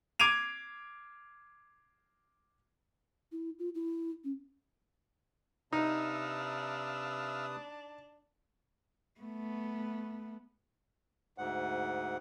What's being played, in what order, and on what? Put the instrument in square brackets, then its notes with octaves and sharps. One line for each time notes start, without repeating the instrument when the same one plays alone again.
[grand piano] D6 G#6 D7 D#7 F7
[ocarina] E4
F4
E4
C#4
[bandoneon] C3 B4 D#6 [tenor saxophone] D4 [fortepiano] D#4 [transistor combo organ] E5 F5
[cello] A3 B3
[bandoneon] D2 G#2 F#5